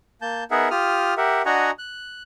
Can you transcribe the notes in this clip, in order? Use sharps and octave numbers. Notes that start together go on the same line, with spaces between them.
A#3 A5 G6
B3 D#4 G#4 A#4 E5 F#5
F4 G4 D#6 F6
G4 A#4 E5 F#5
D4 F#4 D#5 F#5 G#5 A#5
F#6